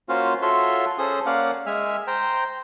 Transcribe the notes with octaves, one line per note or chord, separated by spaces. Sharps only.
A#3 C#4 F4 F#4 C5 F5
F4 F#4 A4 C#5 E5 C6
C#4 G#4 A4 C5 D#6
A#3 C#4 D5 F5 F#5
G#3 E5 G#5 F6
C5 G5 A#5